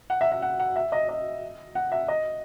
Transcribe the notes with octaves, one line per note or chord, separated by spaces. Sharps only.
F#5
E5
E5
F#5
F#5
E5
D#5
D#5
F#5
E5
D#5